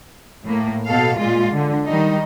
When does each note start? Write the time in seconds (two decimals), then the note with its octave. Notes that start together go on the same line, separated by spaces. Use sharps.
0.44 A2 A#3
0.87 B2 A4 F5
1.18 A#2 G#3 F4
1.52 D3
1.86 D#3 G3 D#4